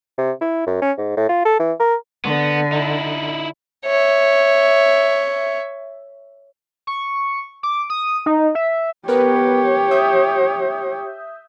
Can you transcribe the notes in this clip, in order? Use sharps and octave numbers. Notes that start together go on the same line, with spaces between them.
C3
E4
F#2
C#4
G#2
A2
F4
A4
E3
A#4
D3 B3
D#4 E4
C#5 E5
C#6
D6
D#6
D#4
E5
B3 G4 A#4 B4 C#5
E5 D#6 G6